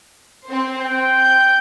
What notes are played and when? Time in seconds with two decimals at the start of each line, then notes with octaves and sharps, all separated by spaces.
0.46 C4 C5
0.79 G5
1.20 G6